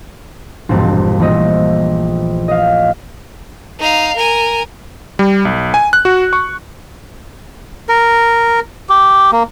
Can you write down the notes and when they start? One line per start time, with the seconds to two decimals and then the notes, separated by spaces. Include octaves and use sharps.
0.69 E1 A#1 G2 C4 A5
1.19 A#1 E3 A3 C4 D#5 E6
2.48 D#5 F5
3.79 D#4 F5
4.16 A#4 G#5
5.19 G3
5.45 B1
5.74 G#5
5.93 F#6
6.05 F#4
6.33 C#6
7.89 A#4
8.89 G4
9.32 A#3